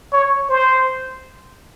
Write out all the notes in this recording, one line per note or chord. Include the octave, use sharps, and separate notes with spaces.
C#5
C5